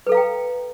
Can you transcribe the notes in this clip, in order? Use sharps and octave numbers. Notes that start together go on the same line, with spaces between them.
A4 B4 F5 G5 A#5